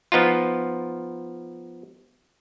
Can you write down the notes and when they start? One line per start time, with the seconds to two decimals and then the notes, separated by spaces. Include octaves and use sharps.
0.12 F3 B3 D#4 F4